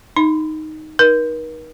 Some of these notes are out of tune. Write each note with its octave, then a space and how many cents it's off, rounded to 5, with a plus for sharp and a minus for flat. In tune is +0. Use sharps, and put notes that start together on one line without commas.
D#4 +0 B5 +0
D#4 +0 A#4 +45